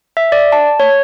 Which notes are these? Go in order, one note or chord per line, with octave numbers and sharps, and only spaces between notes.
E5
D5
A5
C#5